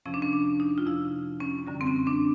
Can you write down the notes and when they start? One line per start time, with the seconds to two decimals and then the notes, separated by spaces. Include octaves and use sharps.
0.06 F2 C3 F3 C#4
0.14 D4
0.22 C#4
0.33 D4
0.60 D#4
0.78 F4
0.86 F2 C3 F3 E4
1.40 C#4
1.67 F#2 D3 G3
1.81 C4
1.87 C#4
2.07 D4